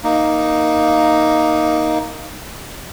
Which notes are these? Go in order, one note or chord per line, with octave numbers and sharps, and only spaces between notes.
A#3 D#4